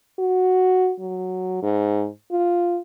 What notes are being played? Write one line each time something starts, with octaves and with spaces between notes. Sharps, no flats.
F#4
F#3
G#2
F4